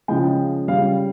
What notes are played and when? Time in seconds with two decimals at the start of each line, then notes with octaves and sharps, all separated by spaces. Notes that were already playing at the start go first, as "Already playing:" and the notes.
0.08 C#3 F3 G#3 G5
0.68 G3 F5
0.72 C#3